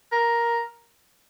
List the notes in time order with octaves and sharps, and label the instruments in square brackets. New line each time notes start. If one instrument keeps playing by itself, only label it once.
[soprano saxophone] A#4